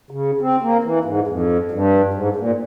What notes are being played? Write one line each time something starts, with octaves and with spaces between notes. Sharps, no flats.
C#3
C4
A#3
E3
G#2
F2
G2
G#2
A#2